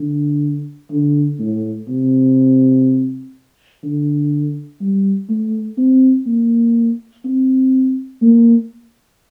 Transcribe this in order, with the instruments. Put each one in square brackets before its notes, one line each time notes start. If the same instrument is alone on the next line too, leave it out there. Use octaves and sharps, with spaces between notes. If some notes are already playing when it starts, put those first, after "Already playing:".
Already playing: [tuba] D3
D3
A2
C3
D3
G3
A3
C4
A#3
C4
A#3